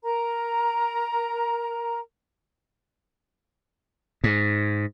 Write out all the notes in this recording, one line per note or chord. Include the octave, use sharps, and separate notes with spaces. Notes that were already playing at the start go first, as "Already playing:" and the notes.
A#4 A#5
G#2